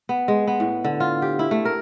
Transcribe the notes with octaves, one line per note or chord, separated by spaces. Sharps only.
B3
G#3
B3
A2
D3
F4
G4
E4
A3
A#4